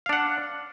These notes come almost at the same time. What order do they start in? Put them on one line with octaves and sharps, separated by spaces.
F5 D4 F#5